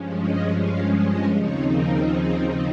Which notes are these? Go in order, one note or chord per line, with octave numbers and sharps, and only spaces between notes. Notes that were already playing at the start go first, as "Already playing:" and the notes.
Already playing: G2 F3 G#3 C#4
D#5
F5
D#5
D#2 C#3 F3 C4 D#4 C#5
A#4
G#4